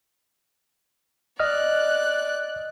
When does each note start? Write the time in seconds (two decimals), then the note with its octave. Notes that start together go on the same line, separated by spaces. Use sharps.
1.40 D5 D#5 F6 F#6